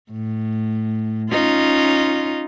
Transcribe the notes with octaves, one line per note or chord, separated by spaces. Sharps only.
A2
C#4 D#4 F4